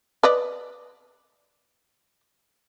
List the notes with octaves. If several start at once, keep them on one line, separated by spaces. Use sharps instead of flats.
B4 D5 D#5